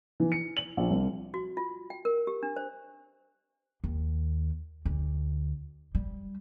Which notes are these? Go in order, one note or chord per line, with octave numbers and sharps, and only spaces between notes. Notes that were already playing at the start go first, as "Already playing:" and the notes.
E3
C#7
F#7
A#1
C2
F#4
F4
G5
A#4
G4
D4
C5
D#2
D2
G3